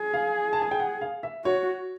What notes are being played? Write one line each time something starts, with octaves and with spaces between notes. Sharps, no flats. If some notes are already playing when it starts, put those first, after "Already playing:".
Already playing: G#4
F5
A5
G#5
G5
F#5
F5
E5
F#4 C#5